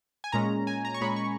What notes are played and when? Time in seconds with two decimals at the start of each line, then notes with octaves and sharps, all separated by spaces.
0.24 G#5
0.32 A#2 G#3 C#4 A#5
0.67 G#5
0.85 A#5
0.94 C#6
1.01 A#2 G#3 C#4 B5
1.16 C#6